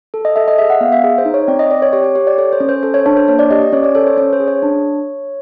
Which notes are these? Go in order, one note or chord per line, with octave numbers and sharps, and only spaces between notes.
A4
D#5
A4 E5
D#5
G#4 E5
F#5
B3 F5
E5
G#4
C5
D#4
C#5
C4 D5
D#5
C4 D5
C#5
G4 C#5
C#5
G4 C#5
D5
A4 C#5
C5
C#4
C5
A4 C5
C#5
D4 C#5
C5
A#3 C#5
D5
G4 D#5
D5
C#4 C#5
D5
A4 C#5
C5
C#4 C#5
C5
G#4
C#5
D4